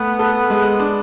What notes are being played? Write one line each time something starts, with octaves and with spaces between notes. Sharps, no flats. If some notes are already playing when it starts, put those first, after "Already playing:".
Already playing: A3 B3
A4
G#3
D4